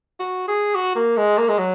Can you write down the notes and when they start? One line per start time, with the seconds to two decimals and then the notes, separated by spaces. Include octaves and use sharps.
0.19 F#4
0.48 G#4
0.75 F#4
0.96 A#3
1.17 G#3
1.38 A#3
1.49 G#3
1.58 F#3